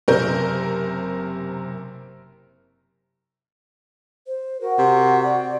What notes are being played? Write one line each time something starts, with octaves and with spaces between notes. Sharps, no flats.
F#1 C3 A#4 G6
C5
F#4 A#4
C3
D5